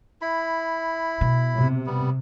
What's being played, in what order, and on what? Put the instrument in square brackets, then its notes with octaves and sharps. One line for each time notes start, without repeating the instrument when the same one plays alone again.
[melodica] E4 B5
[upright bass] B2
[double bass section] C3
[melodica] G3 B3